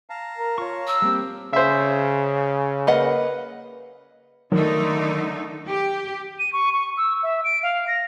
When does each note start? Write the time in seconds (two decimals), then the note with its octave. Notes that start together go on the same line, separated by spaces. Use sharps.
0.10 F5 A5 A#5
0.37 A#4
0.58 F4 C#5 C#6
0.87 E6
1.02 G3 A#3 C4 G4
1.53 C#3 C5 E5
2.87 A#3 B4 D#5 F#5
4.52 D3 D#3 F#3 A3 D#4
5.67 G4
6.39 D#7
6.53 C#6
6.73 C#6
6.97 E6
7.23 E5
7.44 D7
7.63 F5
7.88 A#6